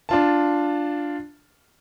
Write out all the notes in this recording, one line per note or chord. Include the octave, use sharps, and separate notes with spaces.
D4 F4 A5